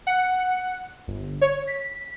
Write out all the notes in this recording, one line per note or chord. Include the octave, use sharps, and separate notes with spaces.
F#5
G1
C#5
B6